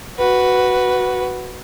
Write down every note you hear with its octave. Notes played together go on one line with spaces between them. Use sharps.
F#4 B4